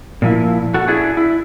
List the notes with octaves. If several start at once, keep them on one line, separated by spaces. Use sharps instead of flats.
A#2 F3 E4
F#4 A4
D4 E4 G#4
E4